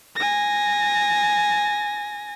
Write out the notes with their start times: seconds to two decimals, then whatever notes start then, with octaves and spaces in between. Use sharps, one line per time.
0.16 G#5 A#6